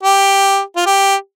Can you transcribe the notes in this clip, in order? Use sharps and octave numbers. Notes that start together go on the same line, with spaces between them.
G4
F4
G4